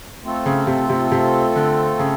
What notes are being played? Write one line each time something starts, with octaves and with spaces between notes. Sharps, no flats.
A3 C4 F4 A4
C#3
C3
C3
C3
D3
C#3